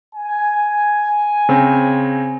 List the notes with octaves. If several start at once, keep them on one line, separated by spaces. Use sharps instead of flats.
G#5
C#3 C4